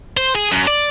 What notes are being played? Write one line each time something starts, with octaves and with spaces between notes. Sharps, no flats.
C5
G#4
F#2
D5